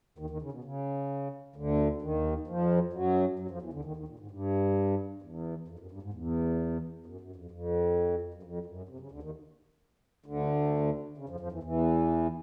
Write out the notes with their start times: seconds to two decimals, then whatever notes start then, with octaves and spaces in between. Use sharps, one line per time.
0.18 D#2 D#3
0.30 D#2 D#3
0.42 C#3
0.52 B2
0.64 C#3
1.56 D2 D3
2.02 D#2 D#3
2.47 F2 F3
2.93 F#2 F#3
3.39 F#2 F#3
3.50 F2 F3
3.62 E2 E3
3.73 D2 D3
3.85 D#2 D#3
3.96 D#2 D#3
4.08 A#2
4.19 G#2
4.31 G2
5.22 E2
5.68 F2
5.79 F#2
5.91 G2
6.02 G#2
6.13 E2
7.06 F#2
7.21 F#2
7.36 F2
7.51 F2
8.34 F#2
8.43 F2
8.66 F#2
8.89 C3
9.00 C#3
9.11 D2 D3
9.22 D#2 D#3
10.26 D2 D3
11.18 C#3
11.29 F2 F3
11.40 F2 F3
11.52 E2 E3
11.63 E2 E3